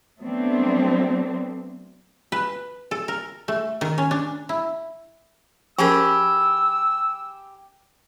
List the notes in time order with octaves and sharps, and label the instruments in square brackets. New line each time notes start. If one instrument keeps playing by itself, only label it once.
[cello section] F#3 A3 B3 C4 D4
[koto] B4
A4
A#4
A3
D#3
C#4
D4
E4
[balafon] F3 C#4 A#4 [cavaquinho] G4 G#4 B5 [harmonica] E6